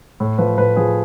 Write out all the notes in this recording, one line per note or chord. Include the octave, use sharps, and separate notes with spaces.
A2
F3 B4
A2 B4
F3 G#4